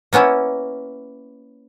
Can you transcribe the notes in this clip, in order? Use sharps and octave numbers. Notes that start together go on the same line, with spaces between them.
A#3 B3 C#4 E4